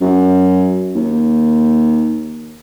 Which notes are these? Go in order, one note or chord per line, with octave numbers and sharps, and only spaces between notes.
F#2
D#2